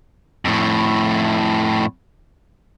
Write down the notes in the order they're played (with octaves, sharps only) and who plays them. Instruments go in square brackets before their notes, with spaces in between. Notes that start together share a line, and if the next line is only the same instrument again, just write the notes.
[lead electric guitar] F2 A2